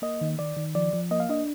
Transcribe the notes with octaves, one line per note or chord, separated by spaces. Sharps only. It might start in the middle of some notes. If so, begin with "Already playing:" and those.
A#3 D#5
D#3
D#3 D5
D#3
F3 D5
F3
A#3 D#5
F5
D4 D#5